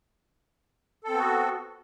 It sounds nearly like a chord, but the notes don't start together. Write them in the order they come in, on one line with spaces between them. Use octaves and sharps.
A4 C4 B3 F#4